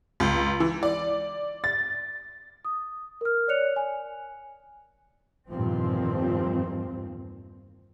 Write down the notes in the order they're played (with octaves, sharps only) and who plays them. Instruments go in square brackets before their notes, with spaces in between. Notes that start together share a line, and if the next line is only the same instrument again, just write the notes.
[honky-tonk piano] C#2
E3
D5
A6
[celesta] D#6
A#4 F6
C#5 D5 F#6 C#7 F7
G#5
[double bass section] E2 G2 A#2 D#3 F3 C4